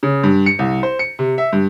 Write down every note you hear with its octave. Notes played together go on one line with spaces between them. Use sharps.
C#3
G2
C#7
C2
C5
C#7
C3
E5
G2